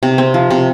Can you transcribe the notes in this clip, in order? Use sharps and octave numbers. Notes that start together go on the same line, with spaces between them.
C3
C4
F3
C3